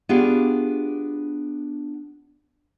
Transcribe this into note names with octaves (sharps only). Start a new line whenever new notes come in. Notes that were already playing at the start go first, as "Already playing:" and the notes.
B3 D4 F4 G4 G#4